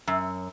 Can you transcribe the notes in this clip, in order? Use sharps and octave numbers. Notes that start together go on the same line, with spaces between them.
F#2